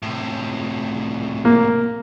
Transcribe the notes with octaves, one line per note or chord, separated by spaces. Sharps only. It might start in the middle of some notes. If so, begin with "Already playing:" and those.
A2 C3
A#3